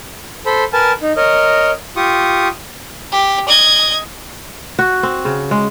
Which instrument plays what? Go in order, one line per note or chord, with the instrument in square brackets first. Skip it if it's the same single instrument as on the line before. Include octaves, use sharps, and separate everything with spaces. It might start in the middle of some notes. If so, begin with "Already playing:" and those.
[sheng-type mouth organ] A4 C5 B5
A#4 B4 G#5 A5
D#4
A#4 C#5 D#5
F4 G4 C#6 D#6
[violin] G4
D#5 G#6
[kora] F#4
C4
C#3
G#3